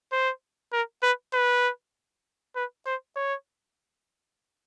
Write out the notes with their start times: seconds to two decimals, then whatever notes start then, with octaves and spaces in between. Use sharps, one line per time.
0.12 C5
0.73 A#4
1.03 B4
1.33 B4
2.56 B4
2.86 C5
3.16 C#5